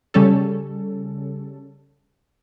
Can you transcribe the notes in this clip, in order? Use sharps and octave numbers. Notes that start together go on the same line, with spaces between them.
C#3 G3 C#4 A4